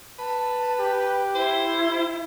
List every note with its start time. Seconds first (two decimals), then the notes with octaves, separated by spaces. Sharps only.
0.19 B4 A5
0.80 G4
1.35 E4 C5